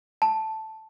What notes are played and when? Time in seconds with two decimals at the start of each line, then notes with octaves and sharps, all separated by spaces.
0.22 A5